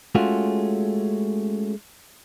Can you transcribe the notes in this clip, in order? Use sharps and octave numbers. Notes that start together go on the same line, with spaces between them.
G#3 A3 C#4 F4 F#4